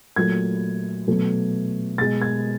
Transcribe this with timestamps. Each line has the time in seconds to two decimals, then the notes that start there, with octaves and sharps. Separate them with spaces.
0.16 A#2 F#3 A3 G#6
1.07 B2 F#3 A3
1.98 B2 G#3 A6
2.22 G#6